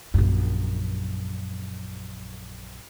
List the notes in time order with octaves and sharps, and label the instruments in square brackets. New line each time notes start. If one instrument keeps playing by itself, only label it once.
[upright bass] A#1 F#2